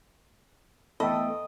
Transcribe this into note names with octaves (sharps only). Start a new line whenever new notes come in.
E2 A3 B3 A4 D#5 G5 B5 D#6